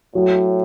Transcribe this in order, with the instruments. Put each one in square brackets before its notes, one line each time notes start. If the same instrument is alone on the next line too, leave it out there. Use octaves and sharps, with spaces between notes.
[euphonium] A2 [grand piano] F#3